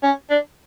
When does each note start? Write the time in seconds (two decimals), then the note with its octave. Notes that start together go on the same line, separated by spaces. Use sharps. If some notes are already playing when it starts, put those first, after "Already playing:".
0.03 C#4
0.30 D4